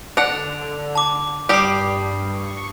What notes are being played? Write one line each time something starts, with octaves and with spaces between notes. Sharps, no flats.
D3 D4 F#5 F7
A5 D6
G2 G3 G4 D#6 C7
C#6